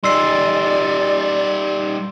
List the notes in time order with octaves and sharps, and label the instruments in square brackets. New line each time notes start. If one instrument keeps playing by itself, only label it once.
[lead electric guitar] G3 D#4 [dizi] D5 [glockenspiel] C6 E6 C7